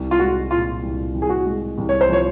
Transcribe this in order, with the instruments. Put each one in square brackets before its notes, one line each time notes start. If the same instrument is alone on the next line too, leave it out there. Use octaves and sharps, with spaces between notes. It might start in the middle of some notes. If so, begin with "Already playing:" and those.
Already playing: [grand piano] C2
[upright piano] F4
[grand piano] G#3 [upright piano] F#4
[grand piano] A#2 [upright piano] F4
[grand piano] C2
C2
[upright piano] G#4
F#4
[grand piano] G#3
C2
[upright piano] C#5
C5
[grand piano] F3 [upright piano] C#5